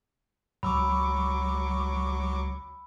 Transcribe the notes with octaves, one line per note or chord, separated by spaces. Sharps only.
C#2 F#3 B5 C#6 D6 E6